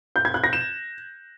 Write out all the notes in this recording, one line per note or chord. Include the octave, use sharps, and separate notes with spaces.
G6
G#6
F#6
A#6
E7